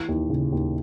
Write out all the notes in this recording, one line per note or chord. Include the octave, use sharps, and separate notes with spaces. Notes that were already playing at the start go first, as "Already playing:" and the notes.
Already playing: E3
D#2
C#3
D#2